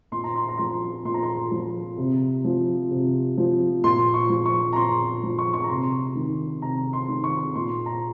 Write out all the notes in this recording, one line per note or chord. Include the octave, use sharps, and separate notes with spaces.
A#2 C6
A#5
C6
A#5
F3 C6
A#2 C6
A#5
C6
F3
C3
F3
C3
F3
A#2 C6
C#6
F3
C#6
A#5
A#2 C6
F3
C#6
C#6
A#5
C3 C6
D#3
C3 A#5
C6
D#3
C#6
A#2 C6
A#5